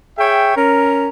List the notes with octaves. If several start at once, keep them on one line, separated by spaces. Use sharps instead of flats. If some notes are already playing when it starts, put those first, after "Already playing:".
G#4 C#5 E5 G5
C#4 A#4